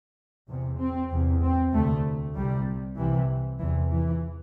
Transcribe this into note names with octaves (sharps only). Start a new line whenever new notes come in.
E2 C3
C4
E2 C3
C4
D2 C3 A3
C2 C3 G3
C2 C3 E3
E2 C3 E3
E3